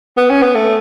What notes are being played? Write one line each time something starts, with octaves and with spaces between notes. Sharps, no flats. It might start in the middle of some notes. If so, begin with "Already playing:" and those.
B3
C#4
B3
A3